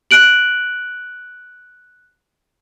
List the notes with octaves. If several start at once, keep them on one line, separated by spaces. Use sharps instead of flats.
F#6 D7 F#7